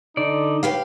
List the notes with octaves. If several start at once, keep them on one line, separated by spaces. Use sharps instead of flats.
D3 D#4 D5
G4 B4 F5